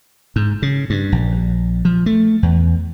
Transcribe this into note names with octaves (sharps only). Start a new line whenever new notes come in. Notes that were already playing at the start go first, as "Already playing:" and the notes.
G#2
C#3
G2
A#1
F3
A3
E2